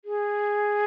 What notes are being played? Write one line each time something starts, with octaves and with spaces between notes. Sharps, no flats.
G#4